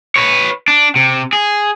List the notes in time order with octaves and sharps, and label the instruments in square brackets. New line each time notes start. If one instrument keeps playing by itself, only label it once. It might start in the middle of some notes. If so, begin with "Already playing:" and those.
[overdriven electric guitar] B4 C#5
D4
C3
G#4